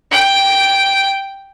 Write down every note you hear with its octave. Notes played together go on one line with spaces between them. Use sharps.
G5